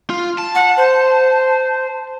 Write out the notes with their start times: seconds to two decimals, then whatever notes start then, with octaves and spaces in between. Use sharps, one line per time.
0.10 F4
0.38 A5
0.55 F#5
0.77 C5